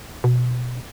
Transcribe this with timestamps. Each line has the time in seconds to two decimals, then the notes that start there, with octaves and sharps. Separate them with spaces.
0.24 B2